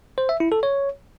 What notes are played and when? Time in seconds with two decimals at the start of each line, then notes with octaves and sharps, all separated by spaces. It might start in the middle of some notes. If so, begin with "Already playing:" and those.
0.18 C5
0.29 E5
0.40 E4
0.52 A4
0.63 C#5